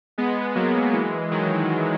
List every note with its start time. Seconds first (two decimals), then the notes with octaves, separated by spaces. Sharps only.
0.18 G#3 B3
0.55 F#3 A#3
0.93 E3 G#3
1.31 D#3 F#3